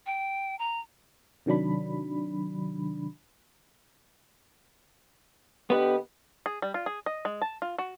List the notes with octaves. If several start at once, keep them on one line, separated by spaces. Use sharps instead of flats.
G5
A#5
C3 D#3 F#3 D4 B5
D3 B3 G4 B4 D#5
G#4
G3
F4
G#4
D#5
G#3
A5
F4
F#4